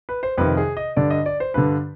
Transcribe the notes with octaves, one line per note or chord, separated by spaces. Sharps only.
B4
C5
F2 C3 D#3 B4
G#4
D#5
G2 D3 D5
D#5
D5
C5
G2 D3 B4